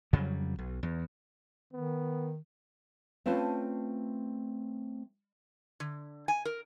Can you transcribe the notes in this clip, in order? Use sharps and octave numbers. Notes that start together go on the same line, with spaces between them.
F2 C#3 F#3 G3
B1
E2
D#3 B3
A3 C4 C#4 F4 B4 A5
D3
G#5
A#4